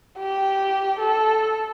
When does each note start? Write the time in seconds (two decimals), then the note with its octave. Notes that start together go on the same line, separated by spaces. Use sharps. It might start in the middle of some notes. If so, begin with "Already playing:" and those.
0.19 G4
0.99 A4